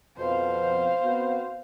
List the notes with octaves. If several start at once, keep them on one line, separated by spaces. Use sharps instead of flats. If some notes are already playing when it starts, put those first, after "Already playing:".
F2 B2 C5 F5
B3 C4 F#4